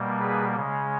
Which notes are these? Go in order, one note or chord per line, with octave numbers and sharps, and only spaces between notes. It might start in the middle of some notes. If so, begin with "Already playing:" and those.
Already playing: B2 G3 A#3
G#4 B4
C#3 G#3